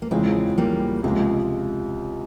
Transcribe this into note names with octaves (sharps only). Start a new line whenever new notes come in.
A#3
E2 C#3 F3 G#3 C4
G3 A#3
C#2 C3 F3 G#3